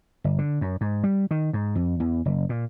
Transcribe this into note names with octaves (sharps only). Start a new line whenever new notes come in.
G1
D3
F#2
G#2
G3
D#3
G#2
F2
E2
F#1
A#2